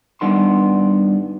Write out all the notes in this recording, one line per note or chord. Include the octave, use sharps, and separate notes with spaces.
G2 D#3 B3 C6